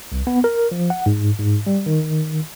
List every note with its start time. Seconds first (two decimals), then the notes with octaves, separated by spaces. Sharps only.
0.12 C2
0.27 B3
0.44 A#4
0.71 F3
0.90 F#5
1.06 G#2
1.39 G#2
1.66 G3
1.86 D#3